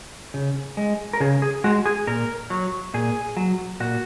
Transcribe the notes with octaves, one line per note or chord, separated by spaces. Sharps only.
C#3
G#3
A#4
C#3 G#4
G#4
G#3 F#4
G#4
A#2 A#4
F#3
A#2 G#4
F#3
A#2 F#4